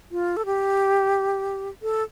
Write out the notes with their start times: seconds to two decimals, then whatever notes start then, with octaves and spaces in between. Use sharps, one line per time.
0.11 F4
0.37 A4
0.45 G4
1.82 A4